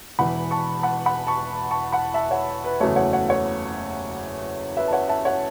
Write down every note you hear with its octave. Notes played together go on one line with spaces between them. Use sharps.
E1 E2 E3 F#5 B5
A5 C#6
F#5 B5
F#5 B5
A5 C#6
A5 C#6
F#5 B5
E5 A5
C#5 F#5
B4
F#1 E2 C#3 F#3 A3 C#5
C#5 F#5
C#5 F#5
C#5 F#5
B4 E5
A5
C#5 F#5
E5 A5
C#5 F#5